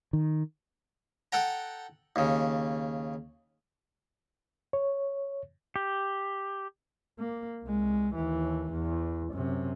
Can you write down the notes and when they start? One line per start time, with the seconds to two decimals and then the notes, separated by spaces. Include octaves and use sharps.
0.13 D#3
1.32 A4 F#5 G5 A#5
2.16 D#2 C#3
4.73 C#5
5.76 G4
7.19 A#3
7.63 C2 G#3
8.15 D#2 E3
8.72 E2
9.33 F#2 C3